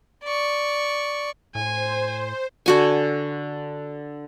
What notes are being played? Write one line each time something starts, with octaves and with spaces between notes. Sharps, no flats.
D5 C#6
A2 C5 G#5
D3 F#4 G#5